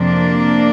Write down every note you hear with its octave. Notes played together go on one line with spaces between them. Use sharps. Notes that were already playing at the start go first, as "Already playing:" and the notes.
Already playing: F2 C3 F3 A#3 D4